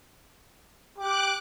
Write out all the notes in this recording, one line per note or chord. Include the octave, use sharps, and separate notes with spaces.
G4 D6 F#6